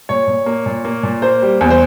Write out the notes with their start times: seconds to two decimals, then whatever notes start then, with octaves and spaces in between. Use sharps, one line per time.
0.09 A#2 C#5
0.27 A#2
0.46 A#3
0.66 A#2
0.85 A#3
1.03 A#2
1.22 A#3 C5
1.42 G3
1.61 E2
1.70 C5